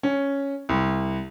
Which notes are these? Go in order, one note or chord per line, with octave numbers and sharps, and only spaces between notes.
C#4
C2